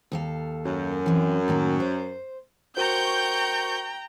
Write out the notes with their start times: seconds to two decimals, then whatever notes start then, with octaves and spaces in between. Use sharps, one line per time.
0.12 D#2 A4 F5
0.65 F#2
1.06 E3 C4
1.48 A2 D#3 A#3
1.80 C5
2.77 F#4 A#4 C5 G5 A#5 C#6 G6